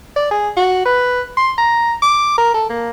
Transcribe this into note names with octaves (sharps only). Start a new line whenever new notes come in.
D5
G#4
F#4
B4
C6
A#5
D6
A#4
A4
A#3